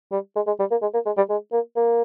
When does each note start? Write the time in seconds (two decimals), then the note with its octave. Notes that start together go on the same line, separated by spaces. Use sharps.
0.11 G3
0.36 G#3
0.47 G#3
0.59 G3
0.71 A#3
0.82 G#3
0.94 A#3
1.06 G#3
1.17 G3
1.29 G#3
1.52 A#3
1.76 A#3